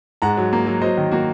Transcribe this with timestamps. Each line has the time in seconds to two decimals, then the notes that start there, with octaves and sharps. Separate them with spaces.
0.22 G#2 F#5 A#5
0.37 F#3
0.53 A#3
0.67 F#3
0.81 F#3 C5 D#5
0.97 D#3
1.12 A#3 F#4